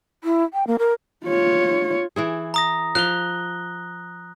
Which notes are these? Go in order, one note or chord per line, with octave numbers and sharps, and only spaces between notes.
E4
G5
A#3
A#4
F4 C#5
E3 E4 G#4
A#5 D#6 A#6
F3 F5 F#6 G7